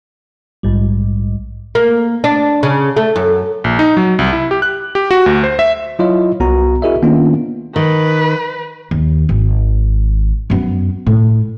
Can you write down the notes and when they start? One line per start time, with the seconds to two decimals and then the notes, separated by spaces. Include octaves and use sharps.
0.63 A#1 G#2 G3
1.75 A#3
2.24 D4
2.63 C#3
2.97 A3
3.16 F#2
3.64 A#1
3.79 D#4
3.97 F#3
4.19 C2
4.33 E4
4.51 G4
4.62 F#6
4.95 G4
5.11 F#4
5.26 D2
5.43 C5
5.59 E5
5.99 F#3 E4 F4 C#5 D#5
6.40 C2 B3 F#4 A#5
6.82 E4 F#4 G#4 A#4 D#5 E5
7.02 D#3 A#3 B3 C#4 D4 F4
7.76 D#3 B4
8.91 D#2
9.29 G#1
10.50 F#2 B3
11.07 A2